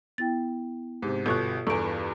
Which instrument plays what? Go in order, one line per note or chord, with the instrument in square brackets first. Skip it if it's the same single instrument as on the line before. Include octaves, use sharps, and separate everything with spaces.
[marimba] B3 E4 G5 [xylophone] A6
[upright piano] G#2 C3 [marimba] G4
[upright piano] G1 B2 [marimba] F4 [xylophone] A4 C#6 F#6
[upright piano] E2 G2 [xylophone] A4 D7 [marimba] C#6